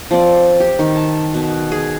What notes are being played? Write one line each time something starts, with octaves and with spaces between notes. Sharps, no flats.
F3 C4 D5
G4
D#3
A5
B2
G#4